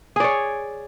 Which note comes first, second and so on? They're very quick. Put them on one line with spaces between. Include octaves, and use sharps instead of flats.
G#4 D5 C#5